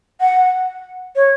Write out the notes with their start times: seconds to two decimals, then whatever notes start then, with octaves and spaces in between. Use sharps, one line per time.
0.21 F#5
1.16 C#5